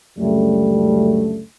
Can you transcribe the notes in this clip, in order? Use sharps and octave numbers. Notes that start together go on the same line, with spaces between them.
C#2 F#2 D3 G3 A3